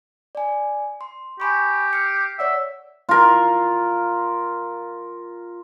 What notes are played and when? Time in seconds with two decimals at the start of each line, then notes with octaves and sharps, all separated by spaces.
0.35 D5 G#5
1.01 C6
1.40 G4 G#5 B5 C#6
1.93 F6 C7 C#7
2.39 C#5 D5 E5 F#5
3.09 F4 A#4